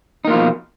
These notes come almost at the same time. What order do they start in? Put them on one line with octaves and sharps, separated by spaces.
D#4 A#3 F4 F3 B2